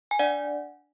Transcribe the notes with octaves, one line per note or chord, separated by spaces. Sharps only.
G#5
D4 D5 F#5